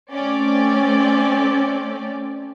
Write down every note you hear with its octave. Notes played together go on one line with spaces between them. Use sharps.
A3 C4 C#4 D5